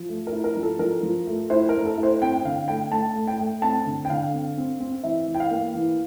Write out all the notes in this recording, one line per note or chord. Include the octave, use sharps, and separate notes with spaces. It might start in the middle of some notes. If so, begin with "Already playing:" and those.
Already playing: F3
A3
A#4
E4
A#4
F3
A4
F3 A#4
F3
A3
E4 C5
A#4
A3
A4
E4
C5
C4 G5
D3 F5
A3 G5
A3 A5
A3
G5
A3
C4 A5
D3
G5
D3 F5
C4
C4
C4
E3 E5
E3
G5
F5
A#3
E3